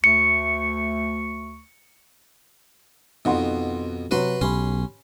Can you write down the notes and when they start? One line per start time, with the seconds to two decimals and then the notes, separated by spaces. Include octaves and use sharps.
0.04 D2 A3 C#6 C#7
3.25 F2 B2 D#3 F#5 C6
4.11 C3 F#3 F#4 B4 C6
4.41 B1 C#4 G4 B5 C6